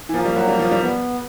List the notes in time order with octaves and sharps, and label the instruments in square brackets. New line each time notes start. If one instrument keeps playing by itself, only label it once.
[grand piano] E3
[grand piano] F3 [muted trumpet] A#3
[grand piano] G3
F#3
G3
F3
G3
[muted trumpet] B3